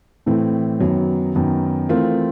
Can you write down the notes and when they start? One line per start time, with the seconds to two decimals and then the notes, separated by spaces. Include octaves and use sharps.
0.26 A2 E3 A3 C4
0.80 F#2 D#3 F#3 B3
1.35 F#2 D#3 F#3 B3
1.89 E3 A3 C4 F4 A#4